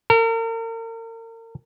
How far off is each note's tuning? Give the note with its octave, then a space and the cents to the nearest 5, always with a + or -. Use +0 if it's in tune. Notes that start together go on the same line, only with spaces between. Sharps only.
A#4 -40